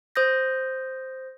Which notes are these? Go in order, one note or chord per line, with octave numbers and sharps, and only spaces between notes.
C5 D#6 G6 A#6